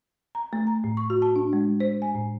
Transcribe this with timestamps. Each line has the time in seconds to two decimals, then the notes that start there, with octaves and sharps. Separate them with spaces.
0.35 A#5
0.53 A3
0.67 A#5
0.84 A2
0.97 C#6
1.10 F#4
1.22 A5
1.36 D4
1.53 G#3
1.80 C5
2.02 G#5
2.15 A2